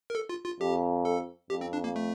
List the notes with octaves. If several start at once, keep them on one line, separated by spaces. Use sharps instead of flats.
A#4
A4
F4
F4
F2 G4
A4
F2 G4
C4
D4
A#3
A3